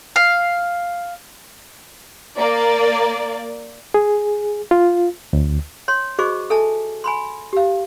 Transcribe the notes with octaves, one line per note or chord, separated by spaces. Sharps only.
F5
A#3 D5
G#4
F4
D2
C#5 C6
F#4 G#4 C5 D#5 C#6 D6
A4 E5 G#5 A5
G#5 B5 C6
G4 F5